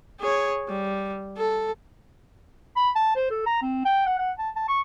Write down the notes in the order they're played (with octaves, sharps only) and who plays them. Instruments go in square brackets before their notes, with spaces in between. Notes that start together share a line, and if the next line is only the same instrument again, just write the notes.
[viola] G#4 C#5
G3
A4
[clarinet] B5
A5
C5
A4
A#5
C4
G5
F#5
F#5
A5
A5
C#6